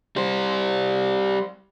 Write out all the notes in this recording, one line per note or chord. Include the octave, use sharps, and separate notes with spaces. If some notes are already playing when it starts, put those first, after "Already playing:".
G3 C5